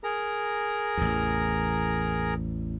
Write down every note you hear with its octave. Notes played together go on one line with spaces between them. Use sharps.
G#4 A#4 A#5
A1 E2